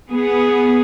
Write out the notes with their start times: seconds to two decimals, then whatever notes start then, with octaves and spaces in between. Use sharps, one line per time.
0.11 B3 G#4